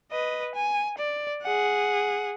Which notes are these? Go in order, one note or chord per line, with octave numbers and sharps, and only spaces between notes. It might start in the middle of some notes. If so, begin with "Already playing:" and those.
B4 D#5
G#5
D5
G#4 F#5